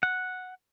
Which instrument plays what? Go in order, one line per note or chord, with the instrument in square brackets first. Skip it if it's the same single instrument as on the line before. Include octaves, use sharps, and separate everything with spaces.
[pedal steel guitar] F#5